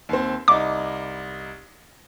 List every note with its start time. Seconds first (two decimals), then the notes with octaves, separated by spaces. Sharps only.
0.09 D#2 C4
0.48 C2 D#4 D6